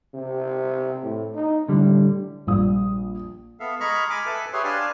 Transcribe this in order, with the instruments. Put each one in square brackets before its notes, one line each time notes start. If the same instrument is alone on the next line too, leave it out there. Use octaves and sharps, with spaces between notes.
[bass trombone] C3
A2
D#4
[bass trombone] A2 [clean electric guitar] D3 G3
[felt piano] A#1 G3 D#6
[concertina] B3 A4 E5 F5
G#3 G#4 A#5 B5 C#6 F6
G#5 B5 D6 F6
A4 B4 E5 G#5 A5 B5
G4 G#4 B4 C#5 E5 C6
D4 B4 F5 G#5 A5 C6